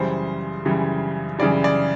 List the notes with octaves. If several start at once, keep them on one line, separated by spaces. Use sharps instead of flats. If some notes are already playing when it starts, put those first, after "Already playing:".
Already playing: F#2 C#3 E3 G3 C5
F#2 C#3 E3 G3
F#2 C#3 E3 G3 D5
D5